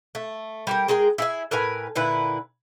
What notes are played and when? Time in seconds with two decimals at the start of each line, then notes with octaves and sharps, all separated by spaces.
0.15 A3
0.67 G3 G4 A#4
0.88 G#3 G#4 A#4 G5
1.18 E4 G#4 E5
1.51 A2 A#4 B4 G#5
1.96 A#2 D3 E4 B4